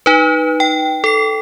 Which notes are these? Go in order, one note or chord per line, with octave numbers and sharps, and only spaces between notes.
D#4 B4
G5
A4 C7